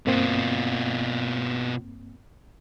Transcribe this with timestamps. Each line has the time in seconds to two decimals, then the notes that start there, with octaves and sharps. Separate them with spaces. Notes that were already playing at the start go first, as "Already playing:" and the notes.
0.06 G2 B2 A#3 C4 F4